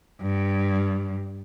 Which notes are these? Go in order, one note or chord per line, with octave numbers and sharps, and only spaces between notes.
G2